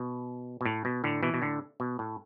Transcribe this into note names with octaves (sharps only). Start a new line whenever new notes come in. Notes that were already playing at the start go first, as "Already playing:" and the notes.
Already playing: B2
B2
A2
B2
A2 D3
B2 E3
B2
A2 D3
B2
A2